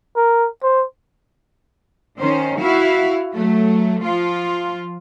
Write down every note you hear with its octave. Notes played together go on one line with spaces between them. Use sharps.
A#4
C5
D#3 C#4 C5
E4 F#4 F5
F#3 A3
F3 F4